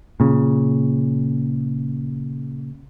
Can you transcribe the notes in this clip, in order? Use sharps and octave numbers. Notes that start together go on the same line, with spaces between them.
A#2 C#3